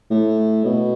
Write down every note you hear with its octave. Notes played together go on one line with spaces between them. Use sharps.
A2
B2